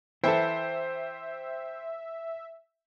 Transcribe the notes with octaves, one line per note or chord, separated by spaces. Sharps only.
E3 E4 A4 C5 E5 G5